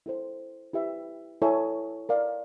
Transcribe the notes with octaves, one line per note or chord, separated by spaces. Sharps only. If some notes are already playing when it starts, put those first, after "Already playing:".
E4 A4 C5
E4 G4 B4 E5
E4 A4 C#5 E5 G#5
A#4 D5 F5